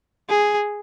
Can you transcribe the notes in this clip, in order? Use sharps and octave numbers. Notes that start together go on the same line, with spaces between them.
G#4